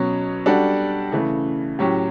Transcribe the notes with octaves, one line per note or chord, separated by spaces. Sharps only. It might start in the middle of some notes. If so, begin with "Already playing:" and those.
Already playing: B2 F#3 C#4
G3 D4 F#4 A4
C#3 E3 A3
A2 F#3 C#4 G4